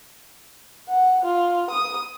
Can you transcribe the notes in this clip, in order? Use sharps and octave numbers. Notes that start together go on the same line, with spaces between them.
F#5
F4
D#6